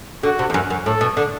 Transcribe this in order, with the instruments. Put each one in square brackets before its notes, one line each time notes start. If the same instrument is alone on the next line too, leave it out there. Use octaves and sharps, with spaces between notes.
[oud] D3 [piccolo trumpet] F#4
[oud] C3
E2
F#2
F#2
[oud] A2 [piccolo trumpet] A4
[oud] B2
D3